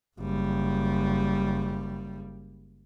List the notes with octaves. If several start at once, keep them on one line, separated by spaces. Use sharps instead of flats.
F#1 G3